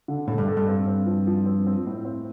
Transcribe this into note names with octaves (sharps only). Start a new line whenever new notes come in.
D3
A2 A3
G2
A4
G2
C4
C4
F3
F3
C4
C4
A2
C4